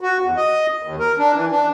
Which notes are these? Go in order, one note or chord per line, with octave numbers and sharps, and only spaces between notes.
F#4
E2
D#5
D#2
A#4
D4
E3
D4